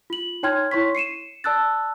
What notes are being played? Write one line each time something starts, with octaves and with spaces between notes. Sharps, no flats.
F4 F#7
D#4 C#5 G5 C6 F6 G#6
E4 C#5 C6 C#6 B6
C7 C#7 D#7 E7
D5 A5 E6 F#6 A6